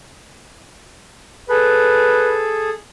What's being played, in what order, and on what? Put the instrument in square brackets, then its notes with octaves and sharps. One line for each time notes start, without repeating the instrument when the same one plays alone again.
[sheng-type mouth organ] G#4 A4 [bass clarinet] B4